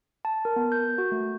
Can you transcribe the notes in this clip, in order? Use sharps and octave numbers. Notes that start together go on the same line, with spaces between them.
A5
A#4
B3
G6
F#4
A3